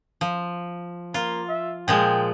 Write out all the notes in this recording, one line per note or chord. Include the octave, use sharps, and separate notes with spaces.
F3
A#3 F4
E5
A#2 F3 G#3 G5